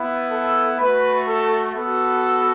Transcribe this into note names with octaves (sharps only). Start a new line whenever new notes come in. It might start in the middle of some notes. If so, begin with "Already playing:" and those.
Already playing: B3 E4
A4
A3 F#4 B4
A4
B3 F#4 A4